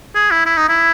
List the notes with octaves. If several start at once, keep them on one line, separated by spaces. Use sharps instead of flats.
G#4
E4
E4
D#4
E4